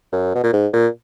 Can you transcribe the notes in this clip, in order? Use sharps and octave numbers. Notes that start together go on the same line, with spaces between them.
F#2
B2
A#2
G#2
A#2